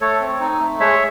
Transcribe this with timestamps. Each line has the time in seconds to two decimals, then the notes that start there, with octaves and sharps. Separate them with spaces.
0.01 A3 A4 C#5
0.20 C4
0.40 D#4
0.60 A3
0.80 G#3 C#5 E5